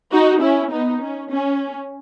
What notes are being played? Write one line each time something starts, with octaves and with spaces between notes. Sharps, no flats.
D#4 F#4
C#4 E4
B3 D#4
C#4
C#4